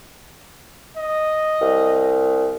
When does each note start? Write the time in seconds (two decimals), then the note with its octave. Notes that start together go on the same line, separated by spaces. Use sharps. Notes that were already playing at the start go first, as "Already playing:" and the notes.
0.97 D#5
1.61 C2